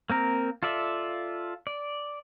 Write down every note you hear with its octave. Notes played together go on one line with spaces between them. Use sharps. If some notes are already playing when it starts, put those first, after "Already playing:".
A#3 C4 A#4
F4 A4 D5 E5
D5